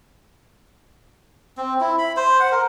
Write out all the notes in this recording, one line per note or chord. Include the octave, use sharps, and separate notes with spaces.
C4
E4
B5
C5
F#5
A#4